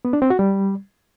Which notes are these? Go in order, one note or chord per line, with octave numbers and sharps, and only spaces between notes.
B3
D4
C4
F#4
G3